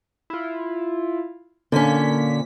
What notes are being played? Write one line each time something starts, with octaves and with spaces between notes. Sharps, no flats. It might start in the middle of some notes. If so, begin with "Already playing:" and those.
E4 F4
A#2 D3 A#3 C#4 B6